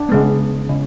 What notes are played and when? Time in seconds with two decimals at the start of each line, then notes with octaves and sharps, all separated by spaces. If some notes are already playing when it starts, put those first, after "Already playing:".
Already playing: D4
0.09 C#3 G#3 B3
0.69 C#3